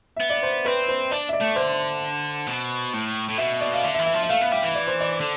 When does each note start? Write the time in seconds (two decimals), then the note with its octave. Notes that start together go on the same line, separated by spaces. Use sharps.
0.16 B3 E5
0.30 D5
0.43 C5
0.65 C4 B4
0.88 C5
1.11 D4 D5
1.29 E5
1.33 D5
1.41 A3
1.56 D3 C5
2.47 B2
2.93 A2
3.29 A2
3.38 B2 E5
3.61 D5
3.73 F5
3.84 D3 E5
3.95 E5
3.99 E3
4.06 E5
4.14 F3
4.23 E5
4.29 A3 F5
4.41 B3
4.52 G3 E5
4.63 E3
4.75 D5
4.87 C5
5.01 D5
5.20 D3